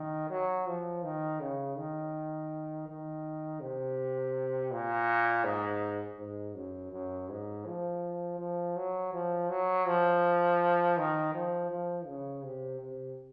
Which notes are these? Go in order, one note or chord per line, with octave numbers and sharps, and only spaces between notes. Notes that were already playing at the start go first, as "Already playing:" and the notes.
Already playing: D#3
F#3
F3
D#3
C#3
D#3
D#3
C3
A#2
G#2
G#2
F#2
F#2
G#2
F3
F3
F#3
F3
F#3
F3
D#3
F3
F3
C#3
C3
C3